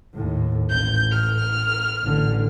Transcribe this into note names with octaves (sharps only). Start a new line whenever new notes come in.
D#2 A2
A1 G6
F6
A1 D3